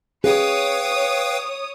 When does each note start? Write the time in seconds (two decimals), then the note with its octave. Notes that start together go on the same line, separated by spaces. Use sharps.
0.24 G#4 B4 C#5 F5 G5 D#6